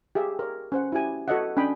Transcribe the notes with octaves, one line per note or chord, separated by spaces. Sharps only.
G4 G#4 E5 F5
A#4 C#5
C#4 C5 F#5
E4 F#4 G4 G#5
F#4 A4 C#5 D#5 E5 F#5
C#4 D4 G5 B5 D#6